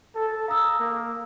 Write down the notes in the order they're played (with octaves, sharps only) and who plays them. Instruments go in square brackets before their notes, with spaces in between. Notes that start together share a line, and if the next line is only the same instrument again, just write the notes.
[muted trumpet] A4
[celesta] F5 D#6 E6 [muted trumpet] A#5
[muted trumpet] A#3